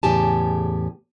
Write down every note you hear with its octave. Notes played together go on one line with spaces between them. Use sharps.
E2 A2 C#3 G4 G#5 A5